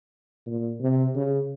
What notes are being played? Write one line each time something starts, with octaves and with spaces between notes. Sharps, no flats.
A#2
C3
C#3